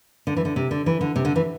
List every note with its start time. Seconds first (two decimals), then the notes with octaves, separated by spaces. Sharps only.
0.27 D3
0.36 E3
0.45 D3
0.56 C3
0.71 D3
0.86 E3
1.01 D3
1.16 C3
1.25 D3
1.36 E3